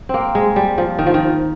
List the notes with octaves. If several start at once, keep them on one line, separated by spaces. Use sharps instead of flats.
A#3 C4
G#3
G3
F3
D#3
F3
D#3